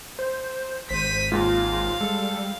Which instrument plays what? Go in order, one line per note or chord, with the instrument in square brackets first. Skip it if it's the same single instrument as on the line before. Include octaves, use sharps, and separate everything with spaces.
[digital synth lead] C5
[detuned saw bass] G#1 [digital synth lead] C5 [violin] B6 D#7
[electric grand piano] D#2 G#2 [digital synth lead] F4 [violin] F5
[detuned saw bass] G3 [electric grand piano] G#3 [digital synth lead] A4